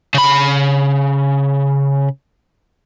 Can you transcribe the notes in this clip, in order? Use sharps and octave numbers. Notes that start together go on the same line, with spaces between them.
C#3 B5